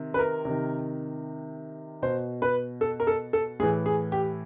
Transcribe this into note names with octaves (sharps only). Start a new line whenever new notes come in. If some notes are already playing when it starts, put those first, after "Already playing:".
Already playing: C3 D#3
B4
A#4
C3 D#3
B2 C5
B4
A4
A#4
A4
A4
A2 E3 G#4
G#4
G4